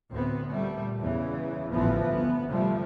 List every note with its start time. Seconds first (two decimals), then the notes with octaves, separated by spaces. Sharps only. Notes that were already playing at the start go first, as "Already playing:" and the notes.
0.11 D2 A2 B3 C4
0.49 A#2 G3 A3
1.00 E2 C#3 E3
1.71 A1 D2 E3 F3 B3
2.09 G1 D2 B3
2.48 C3 F3 G3 A3